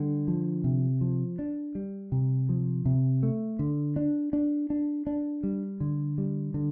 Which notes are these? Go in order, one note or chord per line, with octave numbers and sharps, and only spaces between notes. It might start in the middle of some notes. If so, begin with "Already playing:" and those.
Already playing: D3 G3
F3
C3
F3
D4
G3
C3
F3
C3
A3
D3
D4
D4
D4
D4
G3
D3
G3
D3